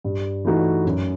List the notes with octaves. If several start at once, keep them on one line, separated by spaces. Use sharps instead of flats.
G2
E3 A3 D#4 F#4
F#2